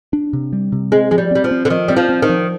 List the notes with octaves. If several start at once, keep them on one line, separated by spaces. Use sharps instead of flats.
D4
C3
G3
C3
G#3 C4
F3 G#3
G3
G3 C4
F3
C4
D3
D#3 F3
G3 C4
F3
C4
D#3
F3